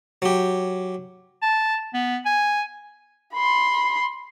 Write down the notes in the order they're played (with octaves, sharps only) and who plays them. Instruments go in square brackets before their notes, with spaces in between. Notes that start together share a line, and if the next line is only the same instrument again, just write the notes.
[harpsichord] F#3 G4
[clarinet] A5
B3
G#5
[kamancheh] B5 C6